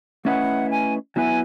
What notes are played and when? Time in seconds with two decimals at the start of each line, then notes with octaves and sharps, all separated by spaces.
0.25 A3 C#4 E4 B4 D#5 F#5
0.70 G#5
1.16 F#3 B3 E4 B4 E5 G#5